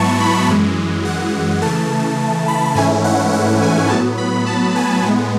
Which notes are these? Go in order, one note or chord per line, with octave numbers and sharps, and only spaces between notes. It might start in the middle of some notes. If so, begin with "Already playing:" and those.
Already playing: G#2 F#3 B3 E4 A5 C#6
B5
F#2 E3 G#3
F#5
C#3 E3 A3 A5
B5
G#2 E3 A3 C#4 E4 G#5
F#5
F#5
G#5
A2 F#3 B3 A5
B5
A5
G#5
A2 G#3 B3